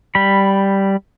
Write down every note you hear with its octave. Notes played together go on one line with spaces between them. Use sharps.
G3 B5